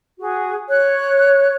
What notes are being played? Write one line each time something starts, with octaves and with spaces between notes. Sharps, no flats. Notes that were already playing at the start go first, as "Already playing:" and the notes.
F#4 G#4
C#5 F#6